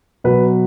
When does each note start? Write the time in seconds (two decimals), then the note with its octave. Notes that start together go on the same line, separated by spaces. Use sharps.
0.24 B2 F#3 B4